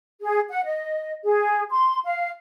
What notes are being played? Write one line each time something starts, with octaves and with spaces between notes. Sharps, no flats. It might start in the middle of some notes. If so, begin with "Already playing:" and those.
G#4
F#5
D#5
G#4
C6
F5